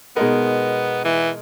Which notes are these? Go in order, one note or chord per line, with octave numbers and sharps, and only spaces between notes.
B2 G#3 B3 D#4 A#4
E3